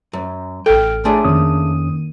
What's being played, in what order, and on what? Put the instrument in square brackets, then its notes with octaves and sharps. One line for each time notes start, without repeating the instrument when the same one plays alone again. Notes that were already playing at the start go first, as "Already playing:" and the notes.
[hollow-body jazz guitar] F#2
[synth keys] A1 F6 D7 [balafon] A4 [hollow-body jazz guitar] G5
[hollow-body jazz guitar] A3 D4 G#4 [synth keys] C#5 G#5 C6
[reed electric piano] F2 C#4 D#6 [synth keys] D#3 A#3 D#7